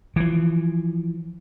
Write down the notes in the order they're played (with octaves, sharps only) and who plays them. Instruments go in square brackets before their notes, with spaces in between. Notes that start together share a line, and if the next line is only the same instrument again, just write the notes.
[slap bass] E3 F3